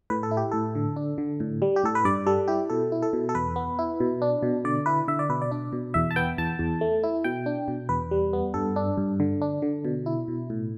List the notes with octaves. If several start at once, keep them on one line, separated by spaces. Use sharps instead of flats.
A2 B4
A4
E4
G4
A2 A4
D3
D4
D3
A2
G3
G4
A2 A4
B4
G2 D5
G3 A4
E4 G4
B2 A4
E4
A4
B2
A4
E2 B4
B3
E4
B2
D4
B2
D3 D5
E4 B4
D3 E5
D5
B2 B4
D5
D4
B2
E2 E5
A5
B3 G5
E2 A5
E2
A3
E4
B2 G5
D4
B2
E2 B4
G3
B3
G2 A4
D4
G2
D3
D4
D3
B2
E4
B2
A2